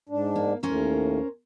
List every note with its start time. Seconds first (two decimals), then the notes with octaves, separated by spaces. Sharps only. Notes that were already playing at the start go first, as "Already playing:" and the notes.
0.09 G#2 D4
0.36 A#3
0.63 D#2 A2 C#4 A#4 C5